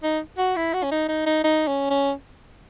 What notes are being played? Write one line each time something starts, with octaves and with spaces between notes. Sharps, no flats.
D#4
F#4
E4
F#4
C#4
D#4
D#4
D#4
D#4
C#4
C#4